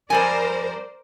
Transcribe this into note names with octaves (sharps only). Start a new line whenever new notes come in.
F2 G3 A#4 C5 D5 G#5